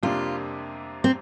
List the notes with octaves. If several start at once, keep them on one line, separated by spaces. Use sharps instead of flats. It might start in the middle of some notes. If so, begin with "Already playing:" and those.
F2 C3 G3 A#3 D4 F4
C4